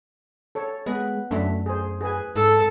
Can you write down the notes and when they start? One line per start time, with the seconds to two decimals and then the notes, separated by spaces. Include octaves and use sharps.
0.55 A4 C#5
0.86 G#3 B3 B4
1.31 F#2 A3 D4 E5
1.66 G#4 C5
2.01 G#4 B4 G#5
2.36 G#2 A4 A5